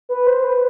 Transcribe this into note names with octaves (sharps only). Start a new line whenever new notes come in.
B4
C5
B4